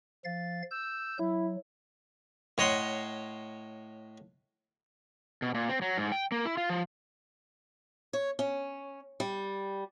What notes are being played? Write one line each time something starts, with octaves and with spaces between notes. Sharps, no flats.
F3 F5 A6
E6 G6
F#3 E4
A2 C#5 D#5 F#5 C6
B2
A#2
C4
F#3
G#2
G5
A#3
E4
F4
F3
C#5
C#4
G3